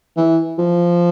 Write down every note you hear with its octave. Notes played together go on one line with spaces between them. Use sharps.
E3
F3